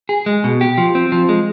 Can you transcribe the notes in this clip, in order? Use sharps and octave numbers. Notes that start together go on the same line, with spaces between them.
G#4
G#3
B2
G4
F3
C4
F3
G#3